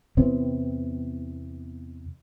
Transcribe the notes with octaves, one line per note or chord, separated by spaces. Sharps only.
E2 C3 B3 C4